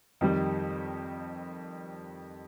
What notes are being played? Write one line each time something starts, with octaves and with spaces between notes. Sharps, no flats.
F2 D#3 G3